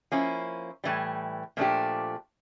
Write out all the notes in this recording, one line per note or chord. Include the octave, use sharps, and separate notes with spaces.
F3 A#3 C#4 E4
A2 E3 G3
A#2 F3 A3 D4 G4